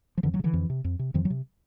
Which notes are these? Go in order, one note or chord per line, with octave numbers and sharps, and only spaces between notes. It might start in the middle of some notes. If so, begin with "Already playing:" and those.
F3
F2 D3 E3
E3 F#3
C3
D3 E3
F2
C3
F2
C3
F2 D#3 F3
E3 F#3
C3